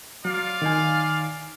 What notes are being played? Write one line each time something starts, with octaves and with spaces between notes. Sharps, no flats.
F#3 F4 D5 F5
D#3 D#4 G#5